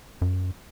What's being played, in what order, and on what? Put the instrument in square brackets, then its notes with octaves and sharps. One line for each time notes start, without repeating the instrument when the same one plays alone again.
[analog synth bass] F#2